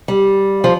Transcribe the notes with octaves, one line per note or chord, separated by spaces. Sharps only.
G3
F3